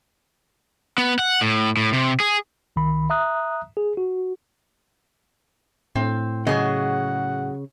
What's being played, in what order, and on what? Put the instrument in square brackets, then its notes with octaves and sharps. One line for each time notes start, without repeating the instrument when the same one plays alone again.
[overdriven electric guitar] B3
F#5
A2
A2
C3
G#4
[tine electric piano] C2 D#3 B5
E5 A#5 D#6 F#6
G#4
F#4
[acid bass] A2 [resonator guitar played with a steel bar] C4
[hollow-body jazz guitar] C#3 [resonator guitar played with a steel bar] F#3 G#4 D#5 [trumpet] F#5